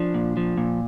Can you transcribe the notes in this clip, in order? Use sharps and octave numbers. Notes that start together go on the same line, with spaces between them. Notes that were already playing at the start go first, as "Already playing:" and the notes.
Already playing: F3 D4
A#2
F3
A#2